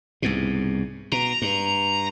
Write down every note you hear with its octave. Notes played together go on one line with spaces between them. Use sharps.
C2 G#2 B2
B2 A#5
G2